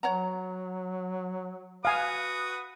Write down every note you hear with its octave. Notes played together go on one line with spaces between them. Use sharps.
F#3 C#5 F#5 A#5
F#4 B4 F5 G#5 D#6